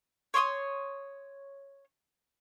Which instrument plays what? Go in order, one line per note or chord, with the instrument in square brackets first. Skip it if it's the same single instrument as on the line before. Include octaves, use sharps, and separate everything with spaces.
[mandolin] C#5 C6 D6 D#6